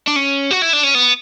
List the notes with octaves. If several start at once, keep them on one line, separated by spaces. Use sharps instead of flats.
D4
C#4
F#4
E4
D4
C#4
B3